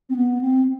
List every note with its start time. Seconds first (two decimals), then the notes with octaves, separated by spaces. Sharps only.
0.09 C4
0.16 B3
0.41 C4